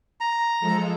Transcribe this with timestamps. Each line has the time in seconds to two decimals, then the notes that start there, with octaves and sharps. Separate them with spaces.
0.21 A#5
0.60 F3 G#3 A4